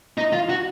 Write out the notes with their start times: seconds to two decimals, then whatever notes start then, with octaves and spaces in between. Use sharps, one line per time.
0.18 D#4
0.33 F4
0.49 F#4